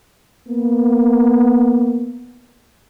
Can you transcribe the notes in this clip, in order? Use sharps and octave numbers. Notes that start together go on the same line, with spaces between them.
A#3 B3